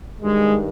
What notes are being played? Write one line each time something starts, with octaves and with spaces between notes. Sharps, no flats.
G2 D#3 G#3